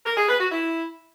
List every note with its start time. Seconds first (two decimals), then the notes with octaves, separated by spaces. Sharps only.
0.06 A#4
0.17 G#4
0.29 B4
0.40 F#4
0.52 E4